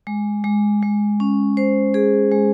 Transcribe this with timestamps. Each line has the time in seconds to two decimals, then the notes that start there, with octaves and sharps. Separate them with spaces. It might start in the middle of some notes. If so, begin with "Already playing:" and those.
0.07 G#3
0.44 G#3
0.82 G#3
1.20 C#4
1.57 C5
1.94 G#4
2.32 G#3